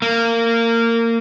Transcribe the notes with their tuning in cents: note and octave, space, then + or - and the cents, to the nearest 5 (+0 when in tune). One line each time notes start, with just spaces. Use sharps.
A#3 -20